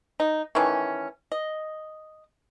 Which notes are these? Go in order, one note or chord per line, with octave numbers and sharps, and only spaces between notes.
D#4
D#3 E3 A3 C#4
D#5